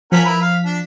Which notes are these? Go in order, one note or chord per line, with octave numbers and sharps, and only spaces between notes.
F3 C#4 A#4 F#5 B6
E4 A#4 B4
F5
D4